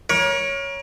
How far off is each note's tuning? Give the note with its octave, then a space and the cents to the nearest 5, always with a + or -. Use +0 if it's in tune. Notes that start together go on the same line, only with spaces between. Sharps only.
A#4 +35 C#5 +0